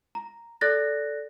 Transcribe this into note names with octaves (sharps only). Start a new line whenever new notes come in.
A#5
A4 D5 F#6 A6 A#6